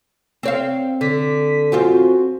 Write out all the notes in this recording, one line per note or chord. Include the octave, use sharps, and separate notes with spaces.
C4 C#5 F5
D3 B6
F#2 C4 F4 F#4